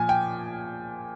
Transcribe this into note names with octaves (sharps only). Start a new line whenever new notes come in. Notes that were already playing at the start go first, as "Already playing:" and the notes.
Already playing: A#2 F3 G#5
G5